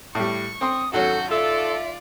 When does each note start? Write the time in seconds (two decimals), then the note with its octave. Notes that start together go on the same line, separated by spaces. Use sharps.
0.15 A2 G3 C#6
0.61 C4 G5 C6 D#6
0.93 G#1 F#3 C#4 F#4 A4 G6
1.31 F4 A4 D5 E5